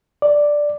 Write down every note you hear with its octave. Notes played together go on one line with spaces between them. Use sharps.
D5